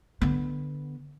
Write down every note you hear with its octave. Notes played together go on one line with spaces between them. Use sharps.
D3 B3